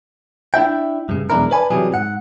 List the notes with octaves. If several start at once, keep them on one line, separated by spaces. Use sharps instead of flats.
D4 E4 E5 G5
G2 C#3
B1 E2 G#3 D4 E4 A#4
B4 D5 G#5 A5 B5
C3 E3 F#3 G3 G#4
G#2 F#5